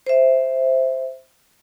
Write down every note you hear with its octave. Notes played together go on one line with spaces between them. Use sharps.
C5 E5